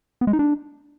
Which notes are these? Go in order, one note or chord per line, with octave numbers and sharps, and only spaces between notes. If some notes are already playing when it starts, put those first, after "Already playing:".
B3
G#3
D#4
D4